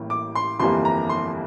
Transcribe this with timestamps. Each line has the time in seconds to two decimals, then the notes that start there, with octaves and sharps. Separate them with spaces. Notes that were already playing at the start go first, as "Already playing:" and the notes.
Already playing: A1 A2 G3 A#3
0.10 D6
0.35 C6
0.59 G1 F2 E3 G3 A#3 C6
0.85 A#5
1.09 C6